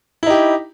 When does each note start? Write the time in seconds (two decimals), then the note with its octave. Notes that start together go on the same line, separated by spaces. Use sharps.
0.23 E4
0.26 D#4
0.30 G4